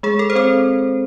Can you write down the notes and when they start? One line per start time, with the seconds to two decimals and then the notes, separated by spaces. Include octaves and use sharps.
0.03 G#3 G#4
0.19 A4
0.30 C5
0.35 C4 A4